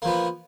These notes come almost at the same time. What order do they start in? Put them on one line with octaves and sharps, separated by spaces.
A#3 F3 B3